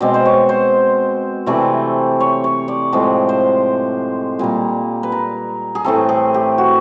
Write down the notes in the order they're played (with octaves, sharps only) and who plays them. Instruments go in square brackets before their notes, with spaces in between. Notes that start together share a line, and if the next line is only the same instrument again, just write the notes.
[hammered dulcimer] B2 G#3 C4 D5
C5
C#5
C5
C3 E3 A3 C4 D5
C#5
C#5
D5
A2 F3 G#3 C4
C5
A#2 G3 A#3
B4
A#4
G#4
A2 E3 A3 C4 A4
G#4
G4
F#4